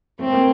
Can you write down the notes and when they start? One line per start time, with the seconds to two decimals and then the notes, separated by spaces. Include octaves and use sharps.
0.19 A3 C4
0.31 A#3